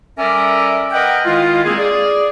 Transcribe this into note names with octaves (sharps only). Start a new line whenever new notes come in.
G3 C#4 A4 A#4 D5 E5
A#4 B4 D#5 F#5 G5
D#3 G#3 E4 F4
G#3 A#3 C4 D#4 G#4
G#4 D5